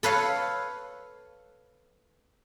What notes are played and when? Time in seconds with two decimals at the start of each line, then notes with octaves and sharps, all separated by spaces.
0.03 A4 B4 C#5 F5